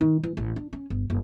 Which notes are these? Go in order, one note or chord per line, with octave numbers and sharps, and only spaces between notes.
D#3
E3
A1
D4
C#4
G1
F#1